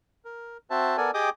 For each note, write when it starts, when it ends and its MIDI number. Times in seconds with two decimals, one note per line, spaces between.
0.25 0.57 70
0.70 0.97 60
0.70 0.97 66
0.70 0.97 72
0.70 0.97 76
0.70 0.97 81
0.97 1.11 59
0.97 1.11 69
0.97 1.11 70
0.97 1.11 74
0.97 1.11 80
1.14 1.30 67
1.14 1.30 68
1.14 1.30 75
1.14 1.30 79
1.14 1.30 86
1.14 1.30 87